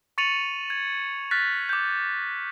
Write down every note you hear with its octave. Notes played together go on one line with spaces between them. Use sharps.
C#6 A6 C#7 D#7 F7 F#7
G#6
F6 F#6 A6 B6
D6 G6